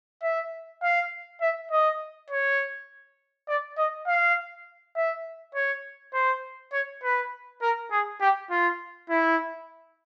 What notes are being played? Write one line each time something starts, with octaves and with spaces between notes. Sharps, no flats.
E5
F5
E5
D#5
C#5
D5
D#5
F5
E5
C#5
C5
C#5
B4
A#4
G#4
G4
F4
E4